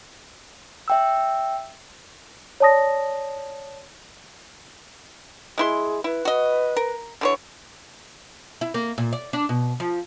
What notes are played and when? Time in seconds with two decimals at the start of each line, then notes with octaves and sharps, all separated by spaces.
0.88 E5 G5 E6
2.60 C#5 D5 A5 D#6 A#6
5.58 G#3 E4 G#4 C6
6.04 E4 B4
6.25 F#4 D#5
6.76 A#4
7.21 D3 E3 C#5
8.61 E4
8.74 A#3
8.98 A#2
9.13 D5
9.33 D4
9.49 B2
9.80 F3